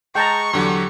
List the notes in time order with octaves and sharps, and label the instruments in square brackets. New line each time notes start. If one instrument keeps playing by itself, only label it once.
[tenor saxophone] G#3 [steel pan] G5 A5 A#5 [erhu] C#6
[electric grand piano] E2 D3 F#3 [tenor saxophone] G4